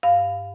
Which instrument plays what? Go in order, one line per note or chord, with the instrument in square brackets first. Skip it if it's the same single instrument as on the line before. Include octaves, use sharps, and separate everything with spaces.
[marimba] G2 F5